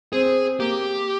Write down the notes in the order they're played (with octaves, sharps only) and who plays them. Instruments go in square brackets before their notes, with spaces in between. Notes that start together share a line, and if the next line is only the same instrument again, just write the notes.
[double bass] C4 [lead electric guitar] G#4
[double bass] A#3 [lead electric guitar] G4